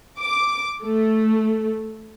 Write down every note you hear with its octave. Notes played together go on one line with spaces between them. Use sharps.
D6
A3